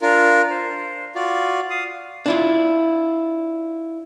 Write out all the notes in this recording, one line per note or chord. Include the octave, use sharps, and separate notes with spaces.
D4 F4 A#4
C5
F4 F#4 D5
F5 D#6
D4 E4 F4